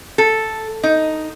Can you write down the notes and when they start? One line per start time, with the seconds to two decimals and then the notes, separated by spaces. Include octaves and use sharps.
0.18 A4
0.83 D#4